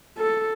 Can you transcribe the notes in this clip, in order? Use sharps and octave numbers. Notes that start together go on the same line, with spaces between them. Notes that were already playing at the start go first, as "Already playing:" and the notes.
A4